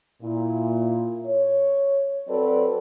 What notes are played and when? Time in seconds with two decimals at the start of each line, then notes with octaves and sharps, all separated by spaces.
0.21 A#2 E4
1.25 C#5
2.27 F#3 C4 F#4 A4 B4 D5